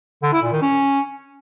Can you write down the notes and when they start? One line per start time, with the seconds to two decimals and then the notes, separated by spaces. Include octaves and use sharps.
0.23 D3
0.33 E4
0.42 A#2
0.52 D#3
0.62 C#4